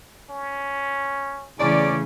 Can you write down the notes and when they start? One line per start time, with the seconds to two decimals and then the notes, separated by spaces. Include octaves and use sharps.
0.30 C#4
1.59 E2 C#3 E3 A3 C#4 D5